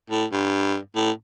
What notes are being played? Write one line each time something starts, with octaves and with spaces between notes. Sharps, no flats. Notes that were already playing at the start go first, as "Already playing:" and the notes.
A2
G2
A2